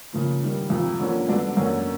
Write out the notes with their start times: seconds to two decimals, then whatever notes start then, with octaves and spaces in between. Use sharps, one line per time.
0.13 C#3 F3 A#3
0.42 G#2 D#3 G3
0.70 F2 C3 F3
0.99 D3 F3 A#3 C#4
1.28 G2 D3 F#3 B3 D4
1.57 F#2 D3 F#3 A#3 C#4